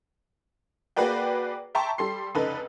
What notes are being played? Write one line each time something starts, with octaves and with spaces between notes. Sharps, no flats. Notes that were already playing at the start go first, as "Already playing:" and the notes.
A#3 F#4 G#4 B4 D5 G5
E5 G5 A5 A#5 C6 C#6
G3 A4 C6 C7
F1 C#2 D#4 A4 B4